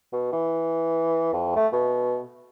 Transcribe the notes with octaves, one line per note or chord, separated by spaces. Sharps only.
B2
E3
F2
A3
B2